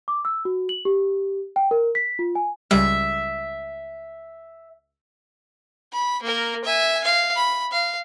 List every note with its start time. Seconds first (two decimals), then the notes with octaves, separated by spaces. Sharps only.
0.08 D6
0.25 E6
0.45 F#4
0.69 F#7
0.85 G4
1.56 G5
1.71 A#4
1.95 B6
2.19 F4
2.35 G#5
2.71 C#2 G3 E5
5.93 B5
6.22 A#3 A#4
6.64 E5 G#5
7.04 F5
7.36 B5
7.72 F5